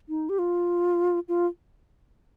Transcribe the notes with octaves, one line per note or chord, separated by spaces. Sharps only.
D#4
G4
F4
F4